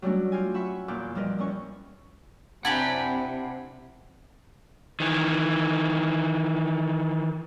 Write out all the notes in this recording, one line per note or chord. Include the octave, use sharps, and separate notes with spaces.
F#3 G3 A3 C#4 D4 F#4
F4 G4 G#5
E5 F#5 B5 C#6 E6
E2 A#2 F4 B4 D6 G6
F3 G3 G4 A#4 B4 D#5
E2 C#4 C#6
C3 D4 E4 G4 F#5 G#5 G#6 F#7
D#3 E3